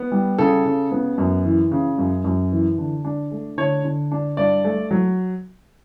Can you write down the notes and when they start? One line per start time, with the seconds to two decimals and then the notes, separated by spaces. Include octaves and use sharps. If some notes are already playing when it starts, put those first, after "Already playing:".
Already playing: B3
0.12 G3
0.38 C#3 A4
0.65 C#3
0.92 B3
1.18 F#2
1.45 E3
1.71 C#3
1.98 F#2
2.24 F#2
2.52 E3
2.78 D3
3.05 D4
3.31 A3
3.58 D3 C#5
3.84 D3
4.12 D4
4.37 G2 D5
4.64 A3
4.91 F#3